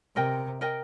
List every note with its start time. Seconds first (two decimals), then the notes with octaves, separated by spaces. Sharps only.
0.16 C3 A#4 D#5 G5
0.61 A#4 D#5 G5